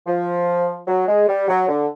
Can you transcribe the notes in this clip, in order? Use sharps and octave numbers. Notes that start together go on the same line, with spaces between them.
F3
F#3
G#3
G3
F#3
D3